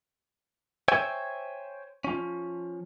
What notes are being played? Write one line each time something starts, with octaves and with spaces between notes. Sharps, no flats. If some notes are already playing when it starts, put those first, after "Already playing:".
C5 C#5 E5 G5 G#5
F3 C#4